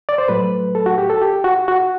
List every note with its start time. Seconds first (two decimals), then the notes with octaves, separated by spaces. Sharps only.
0.09 D5
0.18 C5
0.28 A2 F#3 A3 B4
0.75 A4
0.86 F#4
0.98 G4
1.10 A4
1.22 G4
1.44 F#4
1.68 F#4